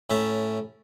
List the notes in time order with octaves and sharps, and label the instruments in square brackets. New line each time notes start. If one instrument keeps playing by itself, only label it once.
[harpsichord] A2 C#4 E5 A5 A#5